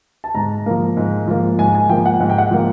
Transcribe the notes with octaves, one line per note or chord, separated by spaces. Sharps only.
A5
G#2 A#5
F3 A#3
G#2
F3 A#3
G#2 G#5
G#5
F3 A#3 G5
F#5
G#2 F#5
G5
F#5
F3 A#3